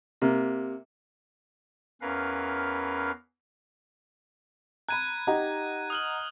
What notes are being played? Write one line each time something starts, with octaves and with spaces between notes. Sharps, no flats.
C3 A#3
E2 C#4 A#4 B4 F5
A#5 B5 F#6 G#6 D#7
D#4 G4 D#5 F#5 A#5
D#6 F6 F#7